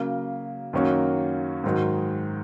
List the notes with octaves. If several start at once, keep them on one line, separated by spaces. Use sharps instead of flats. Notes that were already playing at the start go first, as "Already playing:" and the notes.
Already playing: C#3 F#3 A#3
F#2 D#3 A#3 C#4 F#4
G#2 D#3 F#3